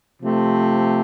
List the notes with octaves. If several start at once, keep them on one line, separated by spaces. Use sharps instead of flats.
C3 F3 A3